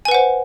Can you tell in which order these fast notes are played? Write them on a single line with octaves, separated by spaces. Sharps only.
G#5 B4 F#5 C5